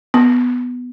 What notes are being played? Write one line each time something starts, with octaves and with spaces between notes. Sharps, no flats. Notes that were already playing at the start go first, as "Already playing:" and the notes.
B3